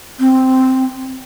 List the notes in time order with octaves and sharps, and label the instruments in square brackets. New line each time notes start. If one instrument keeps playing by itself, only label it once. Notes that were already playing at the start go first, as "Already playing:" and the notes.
[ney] C4